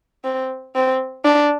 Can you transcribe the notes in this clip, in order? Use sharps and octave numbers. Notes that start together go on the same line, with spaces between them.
C4
C4
D4